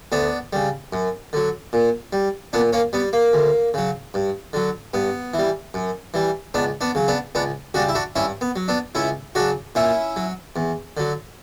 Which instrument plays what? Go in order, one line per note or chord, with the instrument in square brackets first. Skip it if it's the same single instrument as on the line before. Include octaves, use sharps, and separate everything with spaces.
[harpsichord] D2 B3 D4
C#3 G3
F#2
D3 F#3
A#2
G3
A#2 B3 D4
A#3 C#4
G3 B3
A#3
D2
C#3 F#3
G2
D3 F#3
G2 B3
E3 G3
F#2
E3 G3
C#2 B3 D4
B3 D4
C#3 F#3
B3 D4
C#2 B3 D4
C#3 G3 D4 F#4
E4
D4 F#4
G2 C#4 E4
B3
F#3
B3 D4
C#2 C#4 E4
C#3 F#3 D4 F#4
A#2 C#4 E4
F#3
E2
D3 F#3